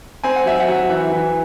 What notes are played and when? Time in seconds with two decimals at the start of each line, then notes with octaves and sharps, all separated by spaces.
0.24 C4 G#5
0.36 F#5
0.46 F#3 E5
0.60 F#5
0.68 F#3
0.90 E3 E5
1.12 E3